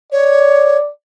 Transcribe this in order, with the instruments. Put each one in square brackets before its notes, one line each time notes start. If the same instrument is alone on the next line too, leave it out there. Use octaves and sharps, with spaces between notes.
[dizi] C#5 [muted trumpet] D5